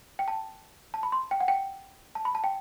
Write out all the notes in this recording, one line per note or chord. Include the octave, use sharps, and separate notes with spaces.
G5
A5
A5
B5
C6
G5
F#5
G5
A5
B5
A5
G5